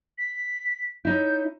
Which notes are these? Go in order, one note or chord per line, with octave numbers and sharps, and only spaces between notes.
B6
C#4 D#4 E4 G6